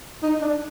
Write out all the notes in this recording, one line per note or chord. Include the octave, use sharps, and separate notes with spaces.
D#4
D4